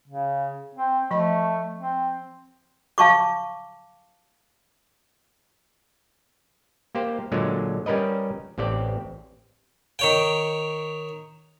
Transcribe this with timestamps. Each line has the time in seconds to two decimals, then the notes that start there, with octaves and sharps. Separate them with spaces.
0.08 C#3
0.75 C4
1.11 F3 A3 D#5 B5
1.77 C4
2.98 F5 A5 C#6 D6
6.95 A#3 G4 C5
7.32 A#2 D3 F#3 G#3
7.86 G3 C#4 A#4 B4 D#5
8.58 A1 C4 G4 D5
9.99 D#3 C#5 G5